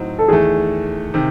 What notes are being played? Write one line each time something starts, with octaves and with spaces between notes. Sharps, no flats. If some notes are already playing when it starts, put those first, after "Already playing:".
Already playing: A2 F#3 C4 D#4
A4
E2 D#3 A3 G#4
C3 D#3